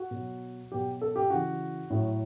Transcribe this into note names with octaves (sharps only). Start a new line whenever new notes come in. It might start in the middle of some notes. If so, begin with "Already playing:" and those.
Already playing: F#4
B2 F#3
B2 F#3 G4
A4
G4
C#3 E3 F#4
A2 F#3